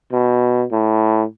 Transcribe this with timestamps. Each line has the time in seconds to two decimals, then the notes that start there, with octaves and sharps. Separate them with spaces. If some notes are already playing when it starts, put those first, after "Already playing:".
0.12 B2
0.71 A2